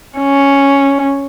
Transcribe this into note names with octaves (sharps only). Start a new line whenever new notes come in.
C#4